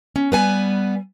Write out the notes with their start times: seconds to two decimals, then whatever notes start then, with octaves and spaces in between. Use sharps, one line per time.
0.16 C#4
0.32 G3 B3 B4 G#5